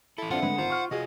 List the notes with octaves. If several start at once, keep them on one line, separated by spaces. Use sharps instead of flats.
E3 E4 A4
C4 D4 F4 E5 F#5
D3 G#3 A3 B4
G#1 F4 C5
C#6 F6
C3 F4 F#4 G#4 D#5